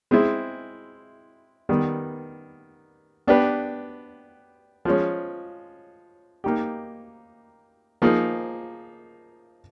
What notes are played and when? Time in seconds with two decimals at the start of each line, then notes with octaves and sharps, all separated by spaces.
0.11 G#3 C4 E4 G#4
1.69 D#3 G3 B3
3.27 B3 D4 G4 B4
4.85 F3 G#3 C#4
6.44 A#3 D#4 G4
8.02 F3 A#3 D#4 G#4